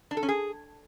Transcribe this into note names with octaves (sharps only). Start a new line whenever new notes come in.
D4
A4
C#4
G#4